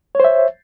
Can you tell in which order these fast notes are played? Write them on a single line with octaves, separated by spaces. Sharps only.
C#5 C5 E5